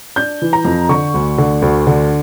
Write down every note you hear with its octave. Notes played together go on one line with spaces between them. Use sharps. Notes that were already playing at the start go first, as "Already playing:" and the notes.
D4 G6
E3
A#5
F2
D3 C#6
D2
D3
D2
D3